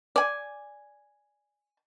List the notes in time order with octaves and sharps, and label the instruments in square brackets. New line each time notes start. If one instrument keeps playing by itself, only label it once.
[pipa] D5 G#5